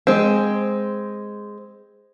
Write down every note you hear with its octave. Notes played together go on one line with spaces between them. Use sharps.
G#3 C4